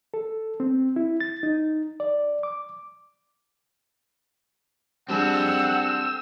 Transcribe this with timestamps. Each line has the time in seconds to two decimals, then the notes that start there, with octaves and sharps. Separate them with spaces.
0.14 A4
0.60 C4
0.96 E4
1.21 A6
1.43 D#4
2.00 D5
2.43 D6
5.09 G3 C4 D4 G#4 A4 F#5 E6